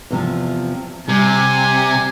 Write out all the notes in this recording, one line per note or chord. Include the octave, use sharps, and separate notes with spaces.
E2 C3 F3
C3 G3 G#5